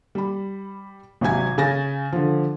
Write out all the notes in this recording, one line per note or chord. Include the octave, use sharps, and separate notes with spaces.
G3 B5
G#1 C3 F#3 G#5 G#6
C#3 G#5 A6 A#6
D3 F3